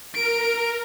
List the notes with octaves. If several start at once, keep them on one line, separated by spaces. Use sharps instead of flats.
A#4 D7